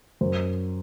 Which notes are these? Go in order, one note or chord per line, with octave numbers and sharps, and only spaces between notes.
F#2 C5